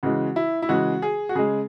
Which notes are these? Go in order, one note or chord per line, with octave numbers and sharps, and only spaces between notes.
C#3 E3 G#3 F#4
E4
E4
C#3 E3 G#3 F#4
G#4
F#4
C#3 G#3 G#4